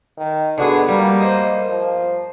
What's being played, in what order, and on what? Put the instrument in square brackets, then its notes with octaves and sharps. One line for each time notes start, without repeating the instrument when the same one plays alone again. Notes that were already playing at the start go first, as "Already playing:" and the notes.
[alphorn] D#3
[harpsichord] D3 F#4 G#4 [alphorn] B3
[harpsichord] G3 [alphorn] A#3
[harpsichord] C5 D#5
[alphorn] F3